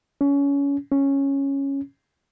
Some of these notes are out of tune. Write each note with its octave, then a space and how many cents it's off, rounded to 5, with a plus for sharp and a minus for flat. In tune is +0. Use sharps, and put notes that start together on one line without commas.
C#4 +25
C#4 -5